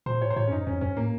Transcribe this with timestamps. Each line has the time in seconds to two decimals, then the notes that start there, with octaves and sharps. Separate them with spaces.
0.06 A#2 C5
0.22 A2 C#5
0.30 C5
0.36 A2 C#5
0.47 C#4
0.51 F#2 D#4
0.67 F2 C#4
0.81 F#2 C#4
0.97 A2 A#3